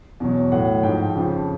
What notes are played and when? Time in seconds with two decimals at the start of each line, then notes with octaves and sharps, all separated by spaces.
0.20 E2 B2 F#3
0.52 A2 F#3 F#5
0.83 G#2 F3 G5
1.15 F2 C#3 F3